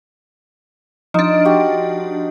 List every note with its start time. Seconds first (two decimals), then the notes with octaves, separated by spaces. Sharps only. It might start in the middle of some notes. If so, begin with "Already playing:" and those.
1.14 F3 D4 D#4
1.45 F#4 G4